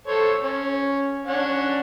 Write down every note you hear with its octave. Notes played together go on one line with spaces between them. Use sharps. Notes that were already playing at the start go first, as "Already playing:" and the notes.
A4 C5 C#5
C#4
C#4 D4 F#5